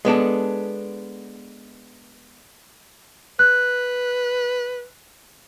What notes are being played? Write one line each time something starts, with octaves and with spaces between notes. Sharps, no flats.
G#3 B3 D4 A4
B4 F#6